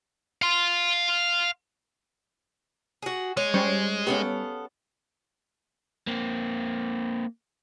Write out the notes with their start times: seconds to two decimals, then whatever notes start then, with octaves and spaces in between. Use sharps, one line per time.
0.42 F5 C6
3.02 F#4 G#4
3.37 G#3 C#5
3.54 G3 C#4 C5 C#6
4.07 B3 C#4 G4 A4 F5
6.07 A#3 C4